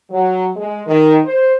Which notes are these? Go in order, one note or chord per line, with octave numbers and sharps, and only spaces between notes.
F#3
G#3
D#3
C5